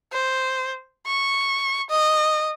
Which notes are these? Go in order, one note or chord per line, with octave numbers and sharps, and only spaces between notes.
C5
C#6
D#5